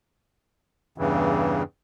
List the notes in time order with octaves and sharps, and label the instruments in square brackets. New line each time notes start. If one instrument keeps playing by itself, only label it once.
[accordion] E2 G2 C#3 E3